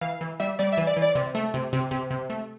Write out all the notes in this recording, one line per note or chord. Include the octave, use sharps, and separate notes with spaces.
E3 F5
E3
G3 E5
G3 D5
E5
E3
D5
E3
D5
C3
A3
C3
C3
C3
C3
A3